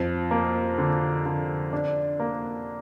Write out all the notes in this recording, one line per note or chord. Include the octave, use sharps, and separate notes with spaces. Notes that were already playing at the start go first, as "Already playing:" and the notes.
Already playing: F2
A#3
D3
D3
D4
A#3